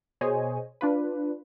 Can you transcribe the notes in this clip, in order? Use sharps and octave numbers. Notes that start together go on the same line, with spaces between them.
B2 G#4 C5 C#5 D#5 G#5
D4 F4 B4